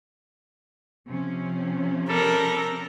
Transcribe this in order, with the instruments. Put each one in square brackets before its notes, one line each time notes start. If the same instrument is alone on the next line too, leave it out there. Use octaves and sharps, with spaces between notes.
[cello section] C3 F3 C#4
[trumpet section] G3 A4 [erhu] A#4